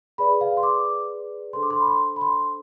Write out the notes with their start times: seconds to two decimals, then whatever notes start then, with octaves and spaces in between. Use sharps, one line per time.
0.18 G#4 B4 D5 B5
0.41 F5
0.57 C6
0.63 D6
1.53 D4 A4 C5 C6
1.63 D6
1.70 C6
1.80 B5
1.88 C6
2.16 B5
2.21 C6